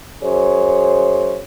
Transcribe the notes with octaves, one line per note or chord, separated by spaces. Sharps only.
F#2 G#4 C5 C#5